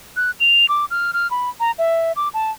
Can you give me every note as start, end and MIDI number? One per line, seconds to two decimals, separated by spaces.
0.16 0.31 90
0.40 0.66 101
0.69 0.85 86
0.90 1.11 89
1.13 1.30 89
1.31 1.49 83
1.60 1.71 82
1.78 2.12 76
2.16 2.28 86
2.34 2.51 81